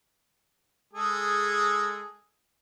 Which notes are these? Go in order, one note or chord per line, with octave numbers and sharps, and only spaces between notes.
G#3 G#4 A4